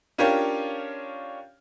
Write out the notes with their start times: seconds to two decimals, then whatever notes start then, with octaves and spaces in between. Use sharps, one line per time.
0.18 C#4 D4 F4 G4 A#4 C#5